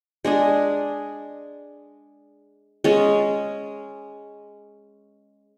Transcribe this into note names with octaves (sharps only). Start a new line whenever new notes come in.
G#3 D4 G#4
G#3 C#4 G#4